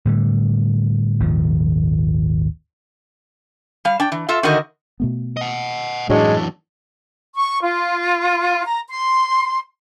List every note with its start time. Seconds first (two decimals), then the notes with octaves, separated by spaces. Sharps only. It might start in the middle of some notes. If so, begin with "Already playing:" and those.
0.05 A2 D3 G3
1.20 G#1 D#2 A#2 F3
3.85 G3 F5
4.00 D4 G5
4.12 E3
4.29 F4 A4 E5
4.43 D3 D#3 D#4 F#4 A#4 D#5
5.00 B2 A3 B3
5.37 D#5 F#5
6.10 F#2 A2 E3 G#3 D4 F#4 C#5
7.34 C#6
7.62 F4
8.65 A#5
8.89 C6